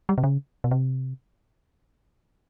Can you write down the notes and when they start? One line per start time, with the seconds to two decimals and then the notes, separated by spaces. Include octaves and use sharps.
0.09 G3
0.18 C3
0.24 C#3
0.64 B2
0.71 C3